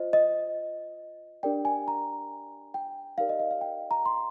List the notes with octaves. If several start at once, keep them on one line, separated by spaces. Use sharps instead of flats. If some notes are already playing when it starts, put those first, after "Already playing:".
Already playing: F4 C5 D#5
D#5
D4 G4 A#4 D5 G5
G#5
A#5
G5
D#4 G4 A#4 D5 F5
D#5
D#5
F5
G5
A#5
C6